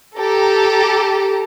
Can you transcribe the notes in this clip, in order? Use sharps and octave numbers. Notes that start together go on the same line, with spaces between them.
G4 A4 A#5